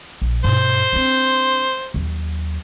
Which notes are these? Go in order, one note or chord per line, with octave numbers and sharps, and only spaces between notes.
A#1
G2 B2 C5
C4 D4
D#2 F#3